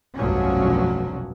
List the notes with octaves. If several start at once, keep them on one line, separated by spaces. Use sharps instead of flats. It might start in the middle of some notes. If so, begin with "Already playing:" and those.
F1 B1 G2 F3 F#3 C#4